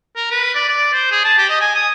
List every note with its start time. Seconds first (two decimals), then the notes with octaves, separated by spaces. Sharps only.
0.16 A#4
0.31 B4
0.54 D5
0.69 D5
0.93 C5
1.11 G#4
1.24 A5
1.38 G4
1.49 D#5
1.61 G#5
1.75 D#6